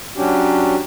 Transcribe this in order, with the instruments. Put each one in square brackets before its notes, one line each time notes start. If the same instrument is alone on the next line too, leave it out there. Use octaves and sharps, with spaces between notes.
[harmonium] F#3 C#4 D4 F#4 G4